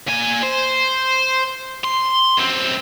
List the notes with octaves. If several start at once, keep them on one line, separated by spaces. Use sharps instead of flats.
A#2 G#5
C5
C6
F#2 C4